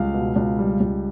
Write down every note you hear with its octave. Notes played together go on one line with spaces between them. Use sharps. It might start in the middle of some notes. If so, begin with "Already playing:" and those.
Already playing: C#2 G3 F5
B2
C#2
G3
C#2